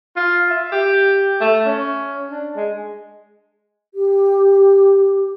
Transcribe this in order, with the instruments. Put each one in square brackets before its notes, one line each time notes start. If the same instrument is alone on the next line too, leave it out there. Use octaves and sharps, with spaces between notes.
[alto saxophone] F4
E5
G4
A3
C#4
D4
G#3
[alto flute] G4